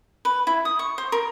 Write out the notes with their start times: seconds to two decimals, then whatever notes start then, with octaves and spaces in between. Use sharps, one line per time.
0.25 B4
0.47 E4
0.65 D#6
0.79 C#6
0.98 C5
1.12 A#4